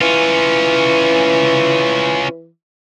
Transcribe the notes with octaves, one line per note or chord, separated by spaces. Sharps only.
E3 C#4 F4